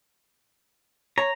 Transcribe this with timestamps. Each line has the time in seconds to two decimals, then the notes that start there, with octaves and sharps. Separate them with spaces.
1.18 C#5 A#5